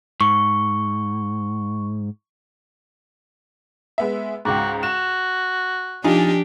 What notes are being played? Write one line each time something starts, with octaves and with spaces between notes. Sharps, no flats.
G#2 C#6
G#3 B3 E5
C#2 G#2 F#4 G5 D6
F#4 E7
F3 D4 D#4 F4 G4 G#5